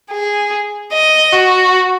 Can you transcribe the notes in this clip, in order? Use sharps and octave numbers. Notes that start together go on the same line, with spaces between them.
G#4
D#5
F#4